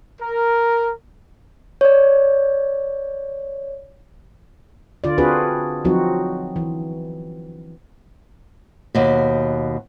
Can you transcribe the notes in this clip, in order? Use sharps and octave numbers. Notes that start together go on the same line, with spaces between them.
A#4
C#5 D5
D3 F4 D5
C4 D4 F4 F#4 G#4 B4
F3 F#3 C4 D#4 F#4
E3
D#2 B2